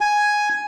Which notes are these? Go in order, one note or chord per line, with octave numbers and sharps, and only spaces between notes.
G#5